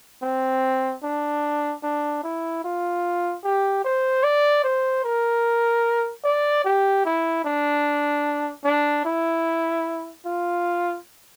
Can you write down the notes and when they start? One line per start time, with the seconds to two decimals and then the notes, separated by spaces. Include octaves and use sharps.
0.22 C4
1.03 D4
1.84 D4
2.24 E4
2.64 F4
3.44 G4
3.85 C5
4.24 D5
4.64 C5
5.04 A#4
6.24 D5
6.65 G4
7.05 E4
7.45 D4
8.65 D4
9.05 E4
10.26 F4